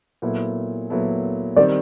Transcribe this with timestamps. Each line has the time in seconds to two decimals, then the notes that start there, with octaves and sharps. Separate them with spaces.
0.22 A#2 F#3 B3 E4 A4
0.90 A#2 F#3 B3 E4 A4
1.56 D#3 G3 C4 D5